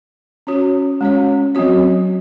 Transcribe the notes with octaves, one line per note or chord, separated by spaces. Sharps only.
C#4 F#4 C#5
G#3 C#4 F#4 C#5
F#3 C4 F#4 C#5